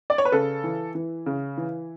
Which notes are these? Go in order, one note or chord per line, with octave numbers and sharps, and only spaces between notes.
D5
C#5
B4
C#3 A4
E3
E3
C#3
E3